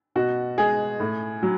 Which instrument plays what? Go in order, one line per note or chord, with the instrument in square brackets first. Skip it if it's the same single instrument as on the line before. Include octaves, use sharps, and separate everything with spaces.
[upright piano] B2 F#4
G#3 G#4
A2
F#3